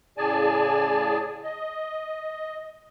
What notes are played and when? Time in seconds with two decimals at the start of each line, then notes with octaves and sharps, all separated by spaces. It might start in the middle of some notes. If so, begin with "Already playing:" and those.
0.18 A2 C#3 G#4 D5 G#5 A5
1.44 D#5